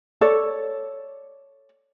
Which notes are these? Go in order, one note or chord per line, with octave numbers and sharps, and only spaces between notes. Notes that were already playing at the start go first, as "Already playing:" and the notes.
A4 C#5 D5